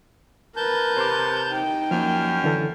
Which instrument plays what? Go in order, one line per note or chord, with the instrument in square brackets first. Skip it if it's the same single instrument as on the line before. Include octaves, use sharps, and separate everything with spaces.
[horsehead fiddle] A#4 B4 [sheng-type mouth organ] A5 G6
[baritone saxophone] C3 [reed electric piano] C5 C6 D6
[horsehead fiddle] D#4 G5
[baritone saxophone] F#2 [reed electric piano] F3 A#3 [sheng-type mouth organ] F6
[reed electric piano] D3 E3 A4